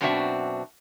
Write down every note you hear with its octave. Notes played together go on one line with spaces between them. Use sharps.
F#2 B2 C4 D4 F#4 E5